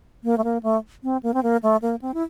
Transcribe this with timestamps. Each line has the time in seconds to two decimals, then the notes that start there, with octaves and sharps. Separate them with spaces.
0.24 A#3
0.38 A3
0.44 A#3
0.63 A3
1.03 C4
1.23 A#3
1.34 C4
1.43 A#3
1.63 A3
1.82 A#3
2.02 C4
2.14 E4